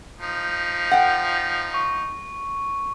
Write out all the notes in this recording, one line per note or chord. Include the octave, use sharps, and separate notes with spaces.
F3 D#4
F#5 G5
C#6